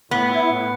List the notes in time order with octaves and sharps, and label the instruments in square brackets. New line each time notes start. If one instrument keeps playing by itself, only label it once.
[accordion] A2 [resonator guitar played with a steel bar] B3
[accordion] E4
A2